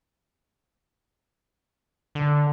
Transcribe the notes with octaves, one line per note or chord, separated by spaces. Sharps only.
D3